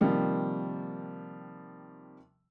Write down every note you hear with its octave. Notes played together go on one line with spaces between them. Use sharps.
C3 D#3 F3 G3 A#3